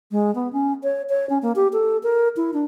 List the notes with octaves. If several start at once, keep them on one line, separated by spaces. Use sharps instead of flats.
G#3
B3
C#4
C#5
C#5
C#4
A#3
G4
A4
A#4
E4
D4